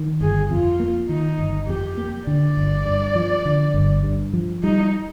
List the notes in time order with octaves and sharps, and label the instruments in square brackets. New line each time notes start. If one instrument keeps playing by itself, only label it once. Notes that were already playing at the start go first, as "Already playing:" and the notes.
Already playing: [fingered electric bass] D#3
[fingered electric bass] G1 [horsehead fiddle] G#4
[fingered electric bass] F2 [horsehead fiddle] F4
[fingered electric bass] A#3
[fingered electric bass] D#3 [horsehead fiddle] D#4
[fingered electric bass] G1
[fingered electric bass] F2 [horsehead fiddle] G4
[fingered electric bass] A#3
[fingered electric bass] D3 [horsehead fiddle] D5
[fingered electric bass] G1
G2
F3
D3
G1
G2
F3
[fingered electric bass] G3 [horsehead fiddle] D#4